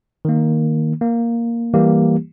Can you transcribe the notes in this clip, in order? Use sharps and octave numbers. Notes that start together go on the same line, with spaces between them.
D#3 A#3
A#3
E3 G3 A#3 G4